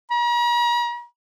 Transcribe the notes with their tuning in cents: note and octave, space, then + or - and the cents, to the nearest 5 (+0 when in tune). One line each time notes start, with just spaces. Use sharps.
A#5 +45